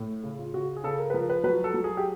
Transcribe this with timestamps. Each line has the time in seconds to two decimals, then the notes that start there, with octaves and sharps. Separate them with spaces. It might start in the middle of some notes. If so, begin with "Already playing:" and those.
Already playing: A2
0.23 C#3
0.39 F4
0.54 C#3 F#4
0.76 G#4
0.84 C#3 A4
0.99 A#4
1.10 B4
1.14 F3 A#4
1.30 B4
1.44 F#3 B4
1.64 A4
1.74 F#3
1.84 G#4
1.97 G4